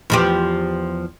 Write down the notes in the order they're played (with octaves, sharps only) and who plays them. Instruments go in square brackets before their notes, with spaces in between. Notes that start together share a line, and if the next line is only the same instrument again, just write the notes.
[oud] E2 F3 G4